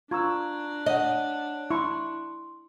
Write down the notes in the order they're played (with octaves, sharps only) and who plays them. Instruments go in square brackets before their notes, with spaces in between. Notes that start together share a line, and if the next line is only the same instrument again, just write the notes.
[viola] D4 [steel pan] F4 E6 [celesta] A#5 C#6 G#6
[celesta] C#5 F#5 [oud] D#5
[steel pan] E4 C#6 [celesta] C6